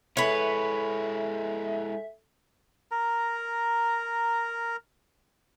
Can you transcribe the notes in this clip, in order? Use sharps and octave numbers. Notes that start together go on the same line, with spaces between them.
G#3 E4 A4 B4 C#5 E5 G#5
A#4 A#5